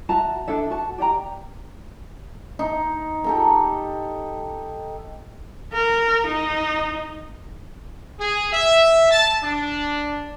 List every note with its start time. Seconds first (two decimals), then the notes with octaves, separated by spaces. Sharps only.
0.09 F#4 E5 A5 A#5
0.47 D4 G#4 A4 E5
0.70 F#4 A5
0.98 G4 D5 G5 A#5
2.59 D#4
3.24 G4 A4 A#5
5.73 A#4
6.27 D#4
8.19 G#4
8.53 E5
9.11 A5
9.42 D4